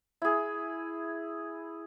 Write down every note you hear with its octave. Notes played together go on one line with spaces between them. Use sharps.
E4 G#4